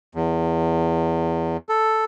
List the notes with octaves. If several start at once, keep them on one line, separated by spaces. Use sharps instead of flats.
E2
A4